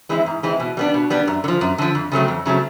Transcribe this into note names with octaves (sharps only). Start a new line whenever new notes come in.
E3 G#3 C4 E4
G#2
E3 G#3 C4 E4
B2
G3 B3 D4
B2
G3 B3 D4
F#2
D3
F3
F#2
D3 F3
F2
C#3 F#3 A3 C4
F2
C#3 F#3 A3 C4